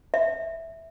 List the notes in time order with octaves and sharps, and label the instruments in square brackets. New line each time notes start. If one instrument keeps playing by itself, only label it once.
[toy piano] E5